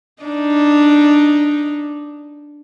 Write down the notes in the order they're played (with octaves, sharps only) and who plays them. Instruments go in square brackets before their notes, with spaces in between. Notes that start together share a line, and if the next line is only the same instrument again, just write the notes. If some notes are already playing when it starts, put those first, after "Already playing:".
[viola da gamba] D4 D#4